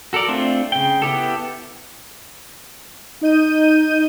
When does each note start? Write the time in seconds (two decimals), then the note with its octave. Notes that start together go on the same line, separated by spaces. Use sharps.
0.13 F#4 A4 A#4 D5
0.28 A3 C4 D4 F4
0.72 C#3 G5
1.02 B3 E4 G4 A4
3.21 D#4 D#5 G6 D#7